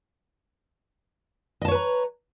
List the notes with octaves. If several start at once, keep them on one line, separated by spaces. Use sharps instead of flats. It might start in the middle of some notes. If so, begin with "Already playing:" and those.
B4 C#5 D#5 A5 A#5